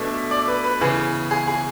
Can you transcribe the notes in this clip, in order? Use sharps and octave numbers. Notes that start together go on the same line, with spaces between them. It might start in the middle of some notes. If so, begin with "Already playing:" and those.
Already playing: B2 A3 D4 E5
D5
B4
B4
C#3 E3 B3 G#4
G#4
G#4